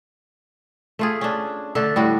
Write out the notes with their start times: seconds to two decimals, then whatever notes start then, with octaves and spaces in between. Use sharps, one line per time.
0.99 A3 F4 G#4
1.21 C#4 D4
1.75 D3 A3 D4 A4
1.96 A2 G3 F#4